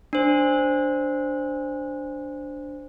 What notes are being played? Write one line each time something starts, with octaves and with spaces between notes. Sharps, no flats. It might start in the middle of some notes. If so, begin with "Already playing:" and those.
D4 C5